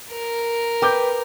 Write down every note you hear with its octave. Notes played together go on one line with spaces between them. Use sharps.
A#4
B4 G5 D6 G6